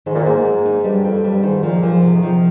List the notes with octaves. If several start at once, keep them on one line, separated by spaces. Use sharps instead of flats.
G#2 D#3
A#2
G#2 A#3
A#3
D#4
G2 G3
F2 G3
G2 G3
G#2 D#3
A#2 F3
G2 F3
G#2
C3
D#3
F3